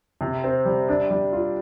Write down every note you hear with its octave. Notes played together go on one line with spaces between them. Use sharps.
C3
C4
G3
D4
G3
F4